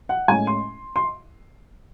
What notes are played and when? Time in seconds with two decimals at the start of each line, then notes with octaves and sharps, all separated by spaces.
0.09 F#5
0.28 A2 G#3 C#4 G#5
0.47 C6
0.96 C6